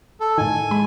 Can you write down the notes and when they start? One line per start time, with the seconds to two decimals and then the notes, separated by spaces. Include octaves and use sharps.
0.20 A4
0.38 A2 D#3 G#5
0.71 G#3 B5